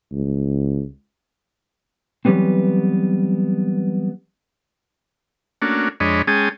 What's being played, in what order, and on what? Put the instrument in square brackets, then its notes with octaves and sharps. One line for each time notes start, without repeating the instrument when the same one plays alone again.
[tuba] C#2
[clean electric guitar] E3 F#3 G3 B3 C4
[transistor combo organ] A3 A#3 C#4 D4 F#4
F2 G#3 D4 C#5 D#5 B5
G#3 C#4 G#4 G5 A5 D#6